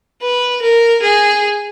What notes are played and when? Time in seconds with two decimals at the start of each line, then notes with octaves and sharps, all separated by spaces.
0.22 B4
0.62 A#4
1.02 G#4